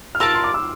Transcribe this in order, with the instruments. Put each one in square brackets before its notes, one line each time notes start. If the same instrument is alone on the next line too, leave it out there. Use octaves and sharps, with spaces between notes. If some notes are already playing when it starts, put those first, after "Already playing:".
[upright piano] F6
[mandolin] F4 A#4 D5 A5 [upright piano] E6
[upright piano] C6
D6
E6